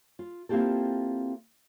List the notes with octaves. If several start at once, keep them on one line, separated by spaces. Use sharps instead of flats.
F4
A#3 C4 E4 F4 G4 A4